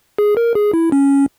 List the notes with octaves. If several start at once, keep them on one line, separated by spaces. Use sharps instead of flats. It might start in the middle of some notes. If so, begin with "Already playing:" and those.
G#4
A#4
G#4
E4
C#4